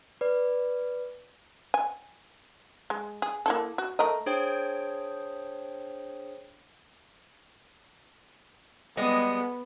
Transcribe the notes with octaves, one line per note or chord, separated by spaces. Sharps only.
B4 D5
G#5
G#3
G#4
A#3 E4 A4
F#4
A3 A#4 D#5
D4 G#4 C5 C#5 G5
G3 G#3 B3 D#5